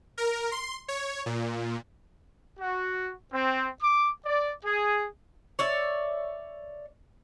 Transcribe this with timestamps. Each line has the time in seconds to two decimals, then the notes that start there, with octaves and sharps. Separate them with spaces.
0.18 A#4
0.52 C6
0.88 C#5
1.26 A#2
2.58 F#4
3.32 C4
3.81 D6
4.25 D5
4.64 G#4
5.59 C#5 D5 E5